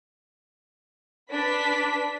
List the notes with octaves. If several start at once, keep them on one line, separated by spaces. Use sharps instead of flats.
D4 B4 B6